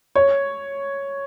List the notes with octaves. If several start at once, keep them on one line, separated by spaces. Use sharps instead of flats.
C#5